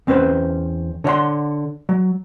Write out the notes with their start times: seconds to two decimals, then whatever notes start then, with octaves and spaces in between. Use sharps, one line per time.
0.07 E2 C4 C#4 B4 C5
1.04 D3 C#5 D5 F#5 C6
1.89 F#3